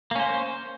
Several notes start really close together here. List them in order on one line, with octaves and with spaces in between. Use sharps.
A#3 C#4 C5